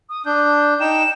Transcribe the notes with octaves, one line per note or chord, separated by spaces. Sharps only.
D#6
D4 G6
D#4 G5 E7